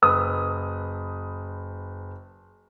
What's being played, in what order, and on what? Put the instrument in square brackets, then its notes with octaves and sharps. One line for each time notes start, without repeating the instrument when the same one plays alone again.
[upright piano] F#1 B4 D#6